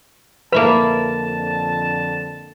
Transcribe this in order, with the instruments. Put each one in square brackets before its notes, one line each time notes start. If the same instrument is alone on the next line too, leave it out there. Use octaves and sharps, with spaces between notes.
[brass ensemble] F2 D3 A5 [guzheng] A#3 E4 B5 [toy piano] B4